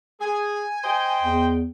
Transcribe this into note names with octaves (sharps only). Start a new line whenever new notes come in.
G#4 G#5
C5 D#5 G5
E2